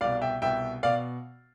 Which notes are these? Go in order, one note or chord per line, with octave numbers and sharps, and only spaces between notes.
C2 B2 D5 F5
E5 G5
C2 B2 E5 G5
B2 D5 F5